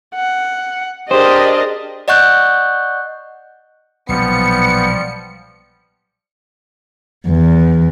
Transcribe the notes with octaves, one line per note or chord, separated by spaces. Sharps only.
F#5
D4 G4 G#4 A#4 C5 D#5
D5 D#5 F#5 C#6 F#6 G6
B1 A#2 F3 G3 B3 C#7
E2